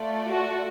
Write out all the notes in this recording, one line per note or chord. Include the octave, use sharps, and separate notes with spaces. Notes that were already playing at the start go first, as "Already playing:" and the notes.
Already playing: A3 F4 A4 D5
F#4